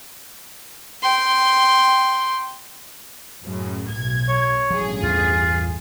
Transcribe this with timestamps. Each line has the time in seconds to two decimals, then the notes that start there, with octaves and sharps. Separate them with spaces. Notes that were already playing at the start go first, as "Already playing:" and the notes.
1.02 G5 C6
3.44 F#2 A2 C#3
3.92 B1 G#6
4.29 C#5
4.70 A1 G2 F3 F#3 G#4
5.03 E2 F4